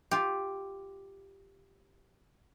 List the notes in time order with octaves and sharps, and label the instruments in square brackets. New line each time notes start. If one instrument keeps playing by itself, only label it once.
[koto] F4 G4